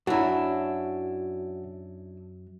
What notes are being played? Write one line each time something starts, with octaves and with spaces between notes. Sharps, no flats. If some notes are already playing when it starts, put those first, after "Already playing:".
F#2 F#3 D4 E4 F#4 F#5